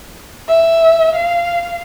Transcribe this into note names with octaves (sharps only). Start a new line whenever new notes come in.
E5
F5